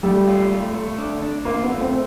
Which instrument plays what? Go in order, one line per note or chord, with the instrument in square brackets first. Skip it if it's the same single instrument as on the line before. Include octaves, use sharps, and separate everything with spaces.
[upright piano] G3 [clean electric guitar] A3
[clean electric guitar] F4
A3
A3
D4
D4
[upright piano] A#3 [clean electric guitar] F4
[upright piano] B3
[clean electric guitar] A3
[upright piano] C4